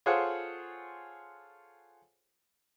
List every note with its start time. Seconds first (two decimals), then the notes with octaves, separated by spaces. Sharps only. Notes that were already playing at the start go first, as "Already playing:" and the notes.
0.06 F4 G#4 A4 C5 C#5 F#5